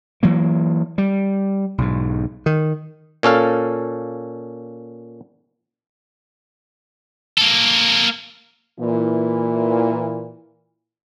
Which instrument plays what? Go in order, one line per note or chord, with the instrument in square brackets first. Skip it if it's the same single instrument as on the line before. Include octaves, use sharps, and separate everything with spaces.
[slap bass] E3 F#3 A#3
G3
B1 G#2
D#3
[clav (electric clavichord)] A#2 C#4 A4 F5
[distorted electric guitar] A#3 A4
[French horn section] A#2 E3